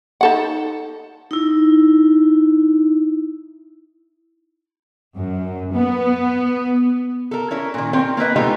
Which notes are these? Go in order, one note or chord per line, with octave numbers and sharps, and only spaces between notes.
D#4 A4 F#5
D#4 E4
F#2
B3
A4 A#4
C#4 E4 A#4
A#2 D#3
C4 A#4 C#5 G5
A#3 E4 B4 D#5
G#3 A3 B3 D#4 F4 G4